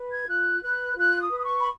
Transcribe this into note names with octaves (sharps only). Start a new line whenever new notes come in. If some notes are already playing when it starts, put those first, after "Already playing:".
Already playing: B4
G#6
F4 F#6
B4 F#6
F4 F#6
D#6
B4
D#6
C#6
B5